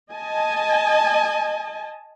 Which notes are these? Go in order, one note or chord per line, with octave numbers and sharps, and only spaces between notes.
D#5 G#5 A5